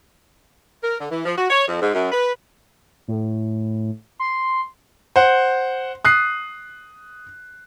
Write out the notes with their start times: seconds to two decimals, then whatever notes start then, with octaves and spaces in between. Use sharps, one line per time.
0.83 A#4
0.99 D3
1.11 E3
1.24 F3
1.38 F#4
1.50 C#5
1.67 F2
1.81 G#2
1.93 F#2
2.11 B4
3.08 A2
4.19 C6
5.16 C5 F#5
6.05 D#6 F#6 C7